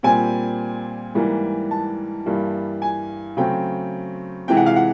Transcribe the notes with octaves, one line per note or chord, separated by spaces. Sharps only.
A#2 G3 C4 G#5
G#2 E3 G3 A#3
A5
G2 E3 G3 A#3
G#5
C#3 F#3 A3 C4 G5
C3 E3 G#3 G5
F#5
F5
F#5